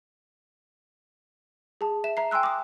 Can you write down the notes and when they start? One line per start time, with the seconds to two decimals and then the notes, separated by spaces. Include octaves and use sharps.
1.81 G#4 A5
2.04 E5 E7
2.17 E5 A#5 C7
2.31 G5 G#5 C6 E6 F#6
2.43 D6 D#6